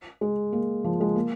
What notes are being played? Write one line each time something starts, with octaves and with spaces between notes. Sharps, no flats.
G#3
A#3
F3
G#3
A#3